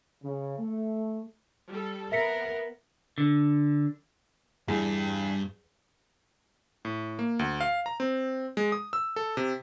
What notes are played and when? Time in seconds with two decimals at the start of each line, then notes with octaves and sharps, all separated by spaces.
0.22 C#3
0.58 A3
1.68 G3 A4
2.12 B3 A#4 E5 B6 C#7
3.18 D3
4.68 E2 G2
6.85 A2
7.19 A#3
7.39 D2
7.61 F5
7.86 A#5
8.00 C4
8.57 G#3
8.72 D#6
8.93 E6
9.16 A4
9.37 C3